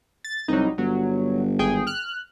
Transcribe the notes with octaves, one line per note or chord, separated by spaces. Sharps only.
A6
C2 F#3 G3 D#4
G1 F#3
G#1 G#4 G5
F6 F#6